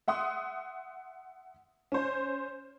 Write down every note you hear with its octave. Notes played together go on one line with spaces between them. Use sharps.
E5 F#5 C6 D#6
C#4 C5